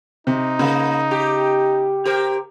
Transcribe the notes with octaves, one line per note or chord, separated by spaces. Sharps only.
C3 D#4
C#3 A#3
G4
G4 A#4 C5